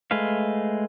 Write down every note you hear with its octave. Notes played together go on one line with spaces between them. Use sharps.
G#3 A3 B4 F5